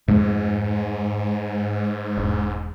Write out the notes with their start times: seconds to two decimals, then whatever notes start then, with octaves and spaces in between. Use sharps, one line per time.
0.08 F2 G#2 G#3 A3
2.17 E1